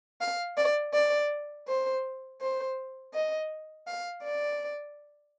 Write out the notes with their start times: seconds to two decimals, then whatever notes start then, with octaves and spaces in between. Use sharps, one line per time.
0.21 F5
0.57 D5
0.94 D5
1.67 C5
2.41 C5
3.14 D#5
3.87 F5
4.23 D5